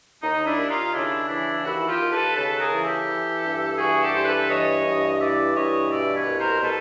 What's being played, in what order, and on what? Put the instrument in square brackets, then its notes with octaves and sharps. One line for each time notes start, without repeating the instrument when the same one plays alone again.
[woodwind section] D#2 D#4
D4 E4
D#2
D#4 F4
C#3 D4 E4
E3 D4 E4
D#2 E4 F#4
F4 G4
D#2
A4 B4
C#3 A4 B4
G#4 A#4
E3
G4 A4
E3
G2
E3 F#4 G#4
G4 A4
G2 C5
A4 B4
E3 C#5 D#5
G2
E3 D5 E5
G2 C#5 D#5
B2 D5 E5
B4 C#5
C2
A#4 C5
B2 A4 B4